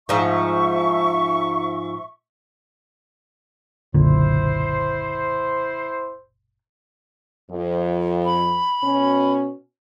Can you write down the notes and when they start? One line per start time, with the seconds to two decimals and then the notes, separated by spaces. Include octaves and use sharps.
0.09 G#2 F3 E5 C#6
3.94 F#1 B1 A#2 D3 E4 C5
7.51 F2
8.25 B5
8.84 B2 C#4